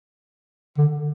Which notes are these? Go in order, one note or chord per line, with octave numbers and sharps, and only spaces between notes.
D3